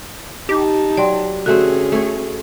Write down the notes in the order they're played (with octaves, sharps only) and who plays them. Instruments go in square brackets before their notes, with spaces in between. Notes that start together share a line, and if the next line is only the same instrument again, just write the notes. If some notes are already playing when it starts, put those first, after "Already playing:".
[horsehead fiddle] D#4 A5 [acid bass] G4
[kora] F#3 [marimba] D5 G5 C6
[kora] D3 A3 C4 [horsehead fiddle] C#4 G#4 [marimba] F#4
[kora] A3 C#5